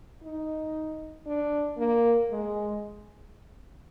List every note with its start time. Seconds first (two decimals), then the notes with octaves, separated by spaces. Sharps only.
0.24 D#4
1.26 D4
1.77 A#3
2.30 G#3